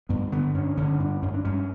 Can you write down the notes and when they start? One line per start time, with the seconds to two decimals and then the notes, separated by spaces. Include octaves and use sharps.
0.09 G2 B3
0.32 D3 B3
0.55 G2 C#4
0.77 D3 C#4
1.00 G2 D4
1.22 G2 C#4
1.34 D4
1.45 G2 C#4